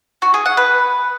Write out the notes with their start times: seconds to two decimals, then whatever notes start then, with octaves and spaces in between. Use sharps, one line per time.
0.22 F#4
0.34 G#4
0.46 F#5
0.57 B4